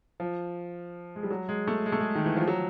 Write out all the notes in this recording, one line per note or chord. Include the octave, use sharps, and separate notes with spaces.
F3
G#3
G3
F#3
G#3
A3
G#3
A3
G#3
D#3
E3
F3
F#3